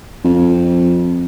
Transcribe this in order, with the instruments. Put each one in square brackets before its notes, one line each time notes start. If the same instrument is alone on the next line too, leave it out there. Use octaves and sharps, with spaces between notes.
[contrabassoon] F2